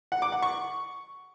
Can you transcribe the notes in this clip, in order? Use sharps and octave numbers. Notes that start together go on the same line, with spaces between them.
F#5
D6
F#5
C#6